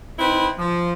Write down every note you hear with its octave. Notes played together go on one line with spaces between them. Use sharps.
C4 D#4 E4 B4
F3